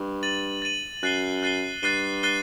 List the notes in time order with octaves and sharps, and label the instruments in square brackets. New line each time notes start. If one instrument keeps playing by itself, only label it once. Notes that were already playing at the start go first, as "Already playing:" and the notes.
Already playing: [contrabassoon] G2
[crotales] A6 D#7 F#7
A6 D#7 F#7
[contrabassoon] F#2 [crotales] F#6 A6 C7 D#7 G7
[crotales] F#6 A6 C7 D#7 G7
[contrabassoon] G2 [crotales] F#6 A6 C7 D#7 G7
[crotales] F#6 A6 C7 D#7 G7